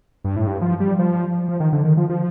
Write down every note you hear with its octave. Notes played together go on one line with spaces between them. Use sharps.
G2
A2
G2
F3
G3
F3
F3
D#3
D3
D#3
F3
F3